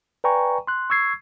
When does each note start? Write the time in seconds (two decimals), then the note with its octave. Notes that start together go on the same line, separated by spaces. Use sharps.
0.24 B4 D5 G5 G#5 A#5 C#6
0.67 C6 F#6
0.90 C#6 E6 G#6 C7